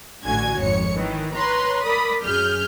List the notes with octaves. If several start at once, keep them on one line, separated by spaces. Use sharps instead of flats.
A1 D3 F#4 G#5 G#6
G#1 F2 C#5 C#7
D#3 E3
B4 C#5 A#5 C6
A#4 D5 B5 D#6
F#2 G#4 F6 G6